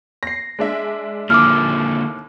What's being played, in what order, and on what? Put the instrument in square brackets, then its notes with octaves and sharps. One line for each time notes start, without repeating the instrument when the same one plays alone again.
[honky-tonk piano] A#6 C7
G#3 D4 E5
[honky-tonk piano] D#2 E4 E6 [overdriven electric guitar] A#2 D3 [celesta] D6 F6